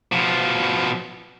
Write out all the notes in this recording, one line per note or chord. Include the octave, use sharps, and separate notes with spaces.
B2 F3